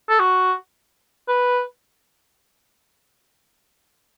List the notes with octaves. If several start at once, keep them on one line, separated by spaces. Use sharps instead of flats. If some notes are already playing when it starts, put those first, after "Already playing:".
A4
F#4
B4